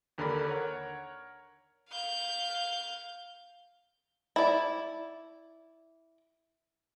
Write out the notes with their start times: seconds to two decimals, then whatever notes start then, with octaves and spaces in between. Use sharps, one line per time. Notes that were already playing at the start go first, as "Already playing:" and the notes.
0.18 D#2 D3 A#4 D5 B5
0.46 A#4 C#5 F#5
1.90 F5 G6
4.36 E4 D5